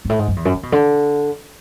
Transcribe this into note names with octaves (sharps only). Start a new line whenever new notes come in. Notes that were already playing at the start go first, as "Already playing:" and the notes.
G#2
A2
G#2
F#2
E2
F#2
D3
B2
D3